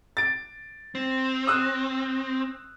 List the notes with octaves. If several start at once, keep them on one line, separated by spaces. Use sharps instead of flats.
A6 D7
C4
D#6 E6 F#6